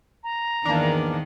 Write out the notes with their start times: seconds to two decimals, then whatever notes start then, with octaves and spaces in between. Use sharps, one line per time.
0.23 A#5
0.65 E2 G#2 D#3 E3 A#3 D4